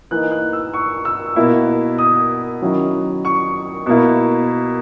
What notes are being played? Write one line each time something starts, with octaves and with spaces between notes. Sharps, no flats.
E3 A#3 D#4 F#6
F#6
E6
C#6
E6
B2 A#3 E4
D#6
D#3 F#3 C#4 E4
C#6
B2 A#3 E4